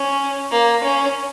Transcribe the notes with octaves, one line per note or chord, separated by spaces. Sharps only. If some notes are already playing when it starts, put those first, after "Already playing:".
Already playing: C#4
A#3
C#4